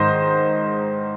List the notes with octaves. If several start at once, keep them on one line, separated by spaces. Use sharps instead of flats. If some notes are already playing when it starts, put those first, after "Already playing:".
Already playing: G#2 D#3 C5 D#5